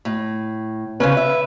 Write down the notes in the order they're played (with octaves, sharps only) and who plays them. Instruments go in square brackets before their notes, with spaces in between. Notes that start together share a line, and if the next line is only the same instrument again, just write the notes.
[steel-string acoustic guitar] A2
[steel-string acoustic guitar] C#3 C#4 [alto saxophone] B4
[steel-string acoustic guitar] E5